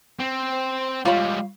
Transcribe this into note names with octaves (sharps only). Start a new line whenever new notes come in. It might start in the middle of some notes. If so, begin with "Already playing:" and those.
C4
G3 G#3 F4 C#5 B5